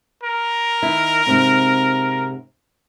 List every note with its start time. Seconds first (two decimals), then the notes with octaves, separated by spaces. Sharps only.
0.23 A#4
0.83 D#3 E4
1.26 G#2 C3 C4